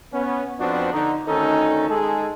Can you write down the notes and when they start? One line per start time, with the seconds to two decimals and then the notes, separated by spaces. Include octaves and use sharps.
0.13 B3 C#4
0.60 F2 F3 B3 C4 D4 F#4
0.93 D3 D#4
1.27 D2 D#3 C#4 D#4 A4
1.90 G#3 D#4 G#4 A4